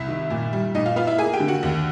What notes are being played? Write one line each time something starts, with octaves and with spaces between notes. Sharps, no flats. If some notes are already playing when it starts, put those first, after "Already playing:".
Already playing: C2 E4 E5
D#3
A#2
G3
A#2 D#4 D#5
F4 F5
B3 F4 F5
E4 E5
A#3 G#4 G#5
G4 G5
D3
F#4 F#5
D#2